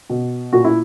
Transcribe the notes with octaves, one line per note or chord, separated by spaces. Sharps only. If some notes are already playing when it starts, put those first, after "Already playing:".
B2
A#2 F#4
E4